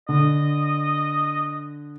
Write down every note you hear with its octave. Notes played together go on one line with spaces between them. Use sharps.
D3 D#5